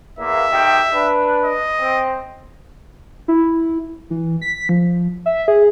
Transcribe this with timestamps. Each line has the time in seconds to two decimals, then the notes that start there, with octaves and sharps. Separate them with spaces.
0.19 E2 A#3 E5
0.52 B1 D#3 G4
0.93 D4 B4
1.45 D#5
1.80 C4
3.28 E4
4.10 E3
4.42 B6
4.69 F3
5.26 E5
5.48 G#4